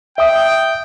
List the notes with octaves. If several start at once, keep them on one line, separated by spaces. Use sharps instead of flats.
E5 G5 D#6